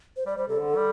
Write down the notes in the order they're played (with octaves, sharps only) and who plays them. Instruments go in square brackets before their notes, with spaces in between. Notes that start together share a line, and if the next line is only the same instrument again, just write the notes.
[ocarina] C5
[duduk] G3 [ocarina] D5
[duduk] G3 [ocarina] C5
[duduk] C3 [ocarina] A4
[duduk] D3
G3